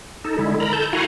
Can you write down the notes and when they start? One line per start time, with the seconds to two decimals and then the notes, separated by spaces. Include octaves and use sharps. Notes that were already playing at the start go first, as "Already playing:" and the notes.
0.25 D#4 A4
0.38 D3 G#3 E4
0.60 A#4 A#5 B5
0.73 A4 A5 G6
0.93 E4 F#4 F5 F#5 G#5 A#5